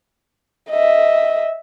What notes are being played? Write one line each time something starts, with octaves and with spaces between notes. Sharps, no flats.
D#5 E5